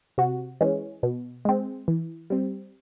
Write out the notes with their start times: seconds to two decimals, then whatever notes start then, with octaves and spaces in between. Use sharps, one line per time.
0.18 C3 F#4
0.61 E3 G#3 C#4
1.03 B2
1.45 G#3 C4
1.88 E3
2.30 G3 C4